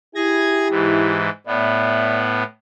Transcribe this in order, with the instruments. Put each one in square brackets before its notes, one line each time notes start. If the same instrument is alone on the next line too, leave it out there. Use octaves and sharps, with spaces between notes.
[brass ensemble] E4 G4 [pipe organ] G#4 G#6 A#6
[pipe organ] G#2 E3
[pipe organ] A2 B3 [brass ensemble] D5 E5